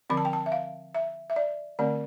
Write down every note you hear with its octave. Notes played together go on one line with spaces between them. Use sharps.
D3 F3 C4 B5
A5
G5
A5
E5
F5
E5
E5
D5
D3 A3 C4 D5